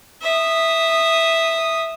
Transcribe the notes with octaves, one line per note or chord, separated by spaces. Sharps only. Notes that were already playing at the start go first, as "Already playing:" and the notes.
E5 D#6